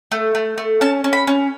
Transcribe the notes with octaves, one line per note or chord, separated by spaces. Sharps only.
A3
A3
A3
C#4 A5
C#4
B5
C#4